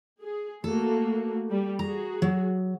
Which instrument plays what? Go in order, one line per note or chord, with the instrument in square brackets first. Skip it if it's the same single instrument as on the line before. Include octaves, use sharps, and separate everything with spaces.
[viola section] G#4
[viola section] A3 A#3 F#4 [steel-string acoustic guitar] A4
[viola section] G3
[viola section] F#4 G#4 [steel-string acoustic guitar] A#5
[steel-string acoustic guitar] F#3